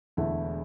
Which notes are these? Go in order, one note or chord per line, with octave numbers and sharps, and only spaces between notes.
E1 E2 D3 A3 E4